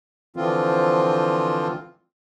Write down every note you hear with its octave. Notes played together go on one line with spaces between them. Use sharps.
D3 E3 F3 C4 F4